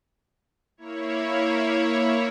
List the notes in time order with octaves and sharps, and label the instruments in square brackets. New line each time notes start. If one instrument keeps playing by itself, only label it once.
[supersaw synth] A#3 E4 C#5